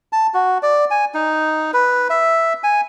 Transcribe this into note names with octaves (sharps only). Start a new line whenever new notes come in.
A5
F#4
D5
G#5
D#4
B4
E5
G#5